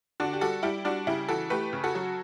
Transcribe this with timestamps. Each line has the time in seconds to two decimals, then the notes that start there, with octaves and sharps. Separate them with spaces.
0.20 D3 D4 F#4
0.33 G4
0.41 G3 F#4 A4
0.63 G3 E4 G4
0.85 G3 D4 F#4
1.07 C#3 E4 G4
1.29 E3 F#4 A4
1.50 A3 G4 B4
1.73 C#3
1.84 F#4 A4
1.95 F#3